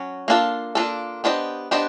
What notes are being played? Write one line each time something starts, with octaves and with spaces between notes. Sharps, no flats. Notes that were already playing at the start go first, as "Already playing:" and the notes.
Already playing: F#3 C#4
A#3 D4 F4 A4
A#3 D4 F4 A4
B3 D4 G4 C5 D#5
B3 D4 G4 C5 D#5